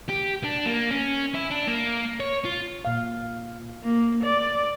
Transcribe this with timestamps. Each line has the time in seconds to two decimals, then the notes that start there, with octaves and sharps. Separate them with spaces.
0.10 G4
0.44 D4
0.66 A#3
0.91 C#4
1.34 E4
1.51 D4
1.68 A#3
2.20 C#5
2.45 F4
2.85 A#2 F5
3.84 A#3
4.24 D5